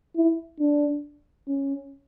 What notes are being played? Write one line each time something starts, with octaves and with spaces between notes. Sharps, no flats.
E4
D4
C#4